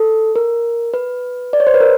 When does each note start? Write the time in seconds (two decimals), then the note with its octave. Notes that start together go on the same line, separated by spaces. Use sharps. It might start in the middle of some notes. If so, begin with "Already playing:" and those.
Already playing: A4
0.36 A#4
0.94 B4
1.53 D5
1.60 C#5
1.67 C5
1.74 B4
1.80 A#4